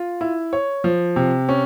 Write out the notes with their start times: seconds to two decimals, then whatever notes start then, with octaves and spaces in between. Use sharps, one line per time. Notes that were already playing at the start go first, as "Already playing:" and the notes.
Already playing: F4
0.21 E4
0.53 C#5
0.84 F3
1.16 C3
1.49 C#4